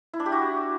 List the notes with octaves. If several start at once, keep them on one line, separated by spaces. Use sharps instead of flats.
E4
D4
G4
F#4